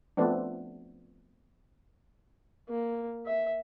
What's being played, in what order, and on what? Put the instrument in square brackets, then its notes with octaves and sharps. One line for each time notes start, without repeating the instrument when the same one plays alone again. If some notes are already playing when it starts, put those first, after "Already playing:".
[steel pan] F3 A3 B3 C4 D4
[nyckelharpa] A#3
E5